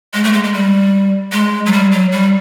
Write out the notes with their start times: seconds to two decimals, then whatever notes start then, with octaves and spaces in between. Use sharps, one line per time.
0.14 G#3
0.24 A3
0.33 G#3
0.44 G#3
0.53 G3
1.32 G#3
1.66 F#3
1.73 G3
1.92 F#3
2.12 G3